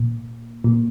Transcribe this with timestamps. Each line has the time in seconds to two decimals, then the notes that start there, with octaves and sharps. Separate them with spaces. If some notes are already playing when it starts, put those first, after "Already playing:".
Already playing: A#2
0.64 A#2